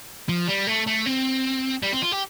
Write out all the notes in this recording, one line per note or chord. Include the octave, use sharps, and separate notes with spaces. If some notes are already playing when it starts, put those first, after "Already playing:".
F3
G3
A3
A3
C4
G3
C4
F4
G4